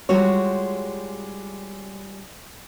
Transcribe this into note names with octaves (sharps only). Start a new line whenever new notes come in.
G3 G#3 F4 F#4 C#5